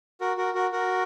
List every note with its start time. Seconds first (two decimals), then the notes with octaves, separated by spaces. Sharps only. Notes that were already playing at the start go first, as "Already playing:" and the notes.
0.21 F#4 A#4
0.37 F#4 A#4
0.55 F#4 A#4
0.72 F#4 A#4